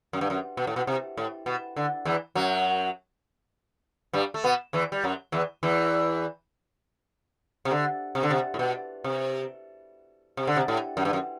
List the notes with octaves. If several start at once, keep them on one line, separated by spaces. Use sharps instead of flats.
F#2
G2
F#2
B2
A2
B2
C3
A2
B2
D3
E2 E3
F#2 F#3
G2 G3
A3
B2 B3
E2 E3
G3
F#2 F#3
E2 E3
E2 E3
C3
D3
C3
D3
C3
A2
B2
C3
C3
D3
C3
A2
F#2
G2
F#2